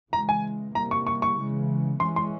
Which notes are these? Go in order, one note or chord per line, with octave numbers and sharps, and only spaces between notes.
C#3 E3 G#3 A#5
G#5
C3 G3 A#3 A#5
C#6
C#6
C#6
C#3 E3 G#3
E3 G#3 C#4 C6
C6